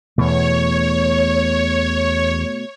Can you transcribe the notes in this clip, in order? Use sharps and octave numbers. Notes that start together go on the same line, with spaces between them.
E2 B2 A3 C#5